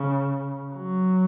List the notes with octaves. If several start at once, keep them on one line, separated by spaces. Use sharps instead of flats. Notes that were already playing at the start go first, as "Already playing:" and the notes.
Already playing: C#3
F#3